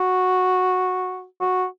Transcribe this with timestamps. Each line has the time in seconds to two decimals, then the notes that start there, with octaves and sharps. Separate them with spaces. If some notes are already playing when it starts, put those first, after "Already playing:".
Already playing: F#4
1.40 F#4